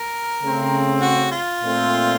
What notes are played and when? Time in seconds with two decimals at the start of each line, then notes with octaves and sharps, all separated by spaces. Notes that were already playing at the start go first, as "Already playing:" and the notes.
Already playing: A#4
0.42 C#3 A3 C4
1.01 F#4
1.32 F4
1.63 A#2 A3 C4